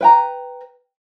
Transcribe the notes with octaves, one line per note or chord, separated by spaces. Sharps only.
B4 G5 A#5